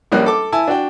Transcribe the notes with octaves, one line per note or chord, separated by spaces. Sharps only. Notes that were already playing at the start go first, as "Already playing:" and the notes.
A#1 G3 A#3 C#4 F#6
A4 D6
E4 G#5 A5 E6
D4 F#4 G5